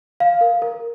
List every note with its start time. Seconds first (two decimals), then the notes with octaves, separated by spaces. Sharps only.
0.20 F5
0.41 A#4
0.62 A#4